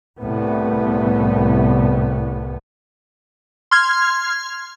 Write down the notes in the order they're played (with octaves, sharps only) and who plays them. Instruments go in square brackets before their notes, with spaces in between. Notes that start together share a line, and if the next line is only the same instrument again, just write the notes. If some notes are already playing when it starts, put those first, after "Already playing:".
[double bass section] C2 A2 B3
[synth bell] C6 F6 G#6